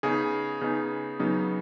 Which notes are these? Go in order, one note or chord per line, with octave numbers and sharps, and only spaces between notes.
C#3 B3 D#4 G#4
C#3 B3 D#4
C#3 F#3 B3 D#4